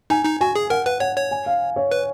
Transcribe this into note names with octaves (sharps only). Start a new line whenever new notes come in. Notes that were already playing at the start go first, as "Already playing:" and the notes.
D#4 G#5
D#4
F#4 G#5
G#4
A#4 F#5
B4 F#5
C#5 F#5
C#5
G#5
F5
C#5
B4